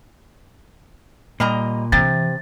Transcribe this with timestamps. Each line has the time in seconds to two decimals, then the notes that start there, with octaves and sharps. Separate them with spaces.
1.40 A#2 G3 D#5 A#5
1.92 C3 E3 A6